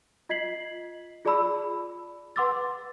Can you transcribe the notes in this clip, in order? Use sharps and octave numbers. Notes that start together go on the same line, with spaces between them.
F4 D#5 G#6 B6 C7 F#7
F4 G#4 D5 A5 B5 E6
B4 F#5 C6 D6 E6 A6